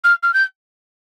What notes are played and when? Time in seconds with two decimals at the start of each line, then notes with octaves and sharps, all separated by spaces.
0.04 F6
0.22 F6
0.33 G6